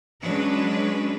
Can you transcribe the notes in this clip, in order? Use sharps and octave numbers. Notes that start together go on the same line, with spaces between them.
F#3 G#3 C#4 D4 B4